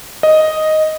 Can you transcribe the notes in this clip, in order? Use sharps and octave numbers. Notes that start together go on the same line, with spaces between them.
D#5